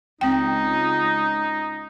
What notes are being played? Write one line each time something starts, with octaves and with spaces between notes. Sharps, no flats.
C#2 C4 D#4 G5